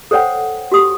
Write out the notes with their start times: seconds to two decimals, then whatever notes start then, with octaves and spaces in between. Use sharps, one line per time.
0.11 A4 C5 C#5 F#5 G5
0.72 F#4 G4 D#6